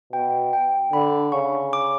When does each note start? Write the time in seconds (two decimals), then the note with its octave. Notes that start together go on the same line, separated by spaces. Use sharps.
0.13 B2 G5
0.53 G5
0.93 D3 B5
1.32 C#3 C#6
1.73 D6